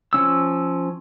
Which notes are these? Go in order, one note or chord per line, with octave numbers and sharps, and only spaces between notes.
F3 C#4 E6